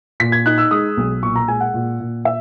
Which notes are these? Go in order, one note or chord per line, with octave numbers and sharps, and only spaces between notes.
A#2 B6
G#6
D#4 F#6
E6
G#3 D#6
B1
A#2 C#6
A#5
G#3 G#5
F#5
A#2
A#2
E5